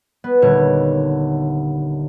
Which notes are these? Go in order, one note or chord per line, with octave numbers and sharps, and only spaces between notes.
B3
D#1 D3 C#5